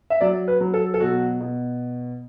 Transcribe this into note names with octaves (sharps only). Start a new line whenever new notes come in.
E5
F#3 D5
B4
F#3
A4
A4
B2 F#4
B2